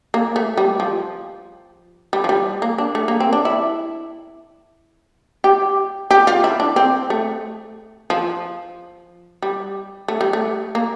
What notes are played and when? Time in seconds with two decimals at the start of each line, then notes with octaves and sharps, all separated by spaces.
0.14 A#3
0.36 A3
0.57 G3
0.80 F3
2.13 G3
2.24 F3
2.29 G3
2.62 A#3
2.78 D4
2.95 A3
3.08 A#3
3.20 C4
3.33 D4
3.45 E4
5.44 G4
6.11 G4
6.27 F4
6.44 E4
6.60 D4
6.76 C4
7.10 A3
8.10 F3
9.42 G3
10.08 A3
10.21 G3
10.33 A3
10.75 A#3